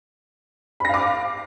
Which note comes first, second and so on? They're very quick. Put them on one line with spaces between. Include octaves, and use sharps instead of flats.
B5 A#6 F5 D6